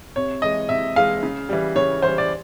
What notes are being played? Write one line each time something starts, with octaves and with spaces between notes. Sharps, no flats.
C3 C#5
E3 G#3 D#5
C3 E5
E3 G#3 F5
C#3
E3 G3
C#3 C#5
E3 G3 C5
D5